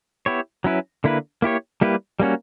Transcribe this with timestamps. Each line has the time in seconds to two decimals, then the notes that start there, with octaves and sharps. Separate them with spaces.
0.26 B3 E4 G4 C#5
0.64 F#3 C#4 E4 B4
1.04 D3 A#3 E4 B4
1.42 A#3 E4 G4 C#5
1.81 G3 A#3 E4 G4 B4
2.20 G3 A#3 C#4 F#4